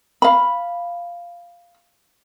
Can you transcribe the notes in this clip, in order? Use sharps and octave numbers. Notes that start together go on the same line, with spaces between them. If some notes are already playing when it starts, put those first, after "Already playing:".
F5 B5